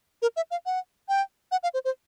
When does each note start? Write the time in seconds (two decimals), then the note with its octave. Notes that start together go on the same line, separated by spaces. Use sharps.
0.22 A#4
0.36 E5
0.51 F5
0.66 F#5
1.09 G5
1.52 F#5
1.63 F5
1.74 C5
1.85 C5